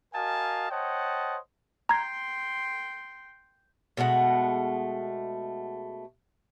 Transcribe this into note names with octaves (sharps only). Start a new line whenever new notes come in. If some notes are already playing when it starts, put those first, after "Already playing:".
F#4 A#4 D#5 F5 G#5 A5
C5 C#5 D#5 F#5 G5 A5
G5 A#5 C6 G#6
B2 G#3 A3 F#5